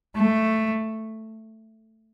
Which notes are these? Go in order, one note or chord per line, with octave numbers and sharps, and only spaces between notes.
A3